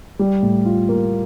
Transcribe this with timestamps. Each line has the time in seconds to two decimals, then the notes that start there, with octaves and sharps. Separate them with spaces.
0.19 G3
0.43 A2
0.66 F4
0.89 A#3